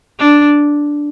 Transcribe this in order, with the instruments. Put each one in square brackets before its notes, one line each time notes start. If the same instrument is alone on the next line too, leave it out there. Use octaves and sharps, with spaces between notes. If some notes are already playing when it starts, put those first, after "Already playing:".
[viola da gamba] D4